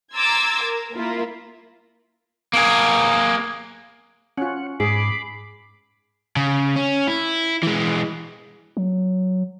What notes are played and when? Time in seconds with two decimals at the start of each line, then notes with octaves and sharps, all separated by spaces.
0.15 A#5 C6 D6 E6 G#6 A6
0.62 A#4
0.94 A#3 E4 F4 A#4
2.53 A#3 G#4
4.38 C#4 F4 F#5
4.80 G#2 G#4 B5 D6 C7
6.36 C#3
6.76 C#4
7.08 E4
7.63 E3 G#3
8.77 F#3